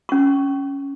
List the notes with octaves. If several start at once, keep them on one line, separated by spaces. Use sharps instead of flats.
C#4 C#6